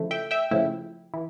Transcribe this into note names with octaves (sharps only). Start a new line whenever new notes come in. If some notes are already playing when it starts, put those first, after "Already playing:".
Already playing: C#3 F3 A3 E4
E5 G5
E5 G5
C#3 F3 A3 E4
E3